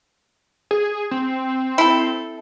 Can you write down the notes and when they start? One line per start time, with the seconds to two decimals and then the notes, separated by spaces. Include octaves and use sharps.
0.71 G#4
1.11 C4
1.78 E4 A4